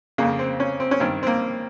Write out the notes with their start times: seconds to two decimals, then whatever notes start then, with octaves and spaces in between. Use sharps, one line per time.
0.18 F2 C#3 A#3
0.39 C4
0.60 C#4
0.80 C4
0.91 C#4
1.00 G2 D#3 C4
1.23 C4
1.27 A#3